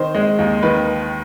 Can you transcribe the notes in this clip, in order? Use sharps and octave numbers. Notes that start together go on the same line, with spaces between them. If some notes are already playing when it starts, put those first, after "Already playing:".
Already playing: D#3 C5
G#3
D#2
D#3 B4